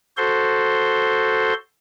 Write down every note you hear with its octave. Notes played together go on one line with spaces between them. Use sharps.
F#4 A4 C5 C6